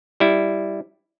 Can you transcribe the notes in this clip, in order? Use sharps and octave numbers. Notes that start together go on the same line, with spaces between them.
G3 E4